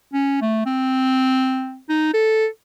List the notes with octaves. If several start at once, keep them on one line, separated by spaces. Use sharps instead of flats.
C#4
A3
C4
D#4
A4